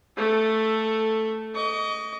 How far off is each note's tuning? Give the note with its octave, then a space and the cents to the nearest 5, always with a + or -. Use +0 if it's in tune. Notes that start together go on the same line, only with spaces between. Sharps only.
A3 +0 A4 +10
D#5 +0 C#6 +45